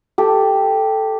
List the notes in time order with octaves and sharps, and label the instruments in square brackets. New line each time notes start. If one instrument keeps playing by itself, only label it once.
[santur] G4 A4